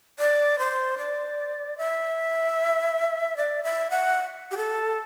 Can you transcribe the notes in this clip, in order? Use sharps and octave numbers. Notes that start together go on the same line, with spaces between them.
D5
C5
D5
E5
D5
E5
F#5
G4
A4